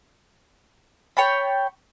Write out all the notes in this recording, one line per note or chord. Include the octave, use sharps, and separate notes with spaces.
C#5 G5 A5 B5